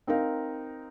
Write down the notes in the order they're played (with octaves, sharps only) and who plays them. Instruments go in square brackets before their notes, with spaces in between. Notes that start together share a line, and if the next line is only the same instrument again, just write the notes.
[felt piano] C4 D#4 A#4 F5